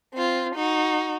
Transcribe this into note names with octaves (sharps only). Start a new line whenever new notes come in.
C4 F4
D#4 F#4